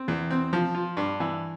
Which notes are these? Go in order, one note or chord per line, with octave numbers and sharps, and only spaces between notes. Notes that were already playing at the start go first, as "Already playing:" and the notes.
Already playing: C4
E2
C4
F3
F4
G2
E3